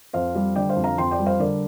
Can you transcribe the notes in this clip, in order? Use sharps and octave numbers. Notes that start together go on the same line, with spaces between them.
F2 C5 F5
G3
D3 D5 G5
C5 F5
F2
F5 A#5
F2 G5 C6
D5 G5
G3
C5 F5
D3 A#4 D5